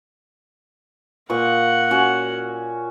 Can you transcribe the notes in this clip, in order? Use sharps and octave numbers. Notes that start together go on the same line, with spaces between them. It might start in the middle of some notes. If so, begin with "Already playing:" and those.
A#2 A#4 F#5 C#6
C#4 F#4